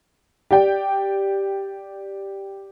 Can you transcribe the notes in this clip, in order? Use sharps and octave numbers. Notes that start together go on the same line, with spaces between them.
G4 D5 G5